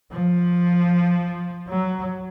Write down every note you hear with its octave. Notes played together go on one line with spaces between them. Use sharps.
F3
F#3